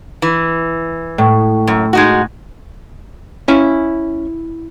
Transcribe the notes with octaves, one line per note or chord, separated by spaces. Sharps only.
E3
A2
F#2
G#3 D#4 F#4
C#4 E4 F5 G#5